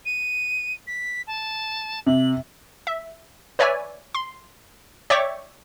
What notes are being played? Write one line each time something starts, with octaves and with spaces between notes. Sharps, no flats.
D#7
B6
A5
C3 F#7
E5
B4 C#5 D5 E5 G#5
C6
C#5 D5 E5 G5 C#6 D6